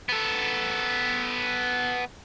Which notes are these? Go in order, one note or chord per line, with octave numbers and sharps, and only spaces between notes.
B3 A4